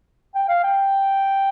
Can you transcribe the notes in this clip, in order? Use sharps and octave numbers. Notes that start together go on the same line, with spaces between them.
G5
F5
G5